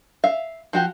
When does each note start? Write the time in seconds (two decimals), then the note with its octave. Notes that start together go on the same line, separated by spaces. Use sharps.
0.24 E5 F5
0.73 F3 F#4 G4